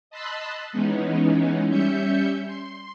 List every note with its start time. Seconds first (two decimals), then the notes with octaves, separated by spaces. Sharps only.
0.10 D#5 A5 B5 C6 E6 F#6
0.72 E3 G#3 B3 C#4 D#4
1.69 G3 C#4 E5 G6 C#7
2.46 C6